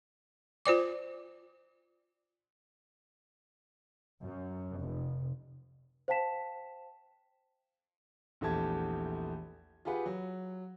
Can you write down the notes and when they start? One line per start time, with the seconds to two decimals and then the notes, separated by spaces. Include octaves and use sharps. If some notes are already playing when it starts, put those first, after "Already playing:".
0.66 F4 C5 D5 D6
4.22 F#2
4.76 F1
6.08 C5 F5 G5 A5 B6 E7
8.41 A#1 E2 A3 G4 A5 G#6
9.85 F4 G4 G#4 B4 F#5
10.06 F#3